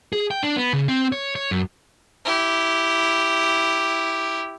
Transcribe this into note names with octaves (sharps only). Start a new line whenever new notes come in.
G#4
G5
D4
B3
C#3
C4
C#5
C#5
F#2
E4 G4